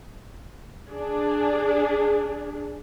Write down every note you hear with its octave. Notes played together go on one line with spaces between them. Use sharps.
D4 G#4